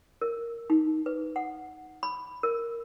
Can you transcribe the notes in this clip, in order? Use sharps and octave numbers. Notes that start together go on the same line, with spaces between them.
A#4
D#4
B4
F#5
B5
A#4